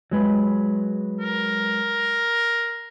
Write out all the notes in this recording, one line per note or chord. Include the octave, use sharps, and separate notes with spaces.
F#3 G#3 B4
A#4